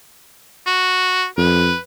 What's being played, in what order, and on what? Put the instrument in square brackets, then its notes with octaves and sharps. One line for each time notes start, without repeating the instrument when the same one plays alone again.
[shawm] F#4
[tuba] F2 [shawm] B4